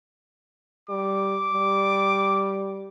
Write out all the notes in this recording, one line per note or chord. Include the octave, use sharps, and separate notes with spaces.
G3 D6
G3